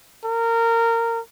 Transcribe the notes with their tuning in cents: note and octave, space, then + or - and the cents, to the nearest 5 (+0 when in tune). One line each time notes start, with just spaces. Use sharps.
A#4 -20